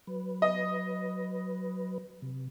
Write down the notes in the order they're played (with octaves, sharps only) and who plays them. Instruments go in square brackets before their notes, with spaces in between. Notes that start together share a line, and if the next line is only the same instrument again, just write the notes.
[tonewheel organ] F#3 B4
[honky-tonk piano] D#5
[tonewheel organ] C3